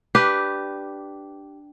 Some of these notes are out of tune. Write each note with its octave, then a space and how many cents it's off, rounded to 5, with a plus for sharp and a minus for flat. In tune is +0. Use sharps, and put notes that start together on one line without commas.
D4 +5 G4 -10 B4 +0